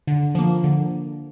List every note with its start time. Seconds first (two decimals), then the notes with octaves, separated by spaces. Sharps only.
0.07 D3
0.35 F3 A#3
0.64 D3